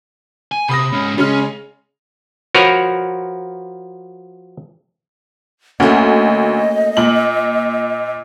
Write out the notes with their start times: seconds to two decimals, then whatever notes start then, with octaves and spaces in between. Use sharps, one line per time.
0.52 G#5
0.69 C3 B5 D#6 A#6
0.92 G#2 C#4
1.18 C#3 G#3 C#4 F6
2.54 F3 F#4 A#4 B4 C#5 A#5
5.80 D2 A3 A#3 C#4 D#5
6.97 A#2 F#7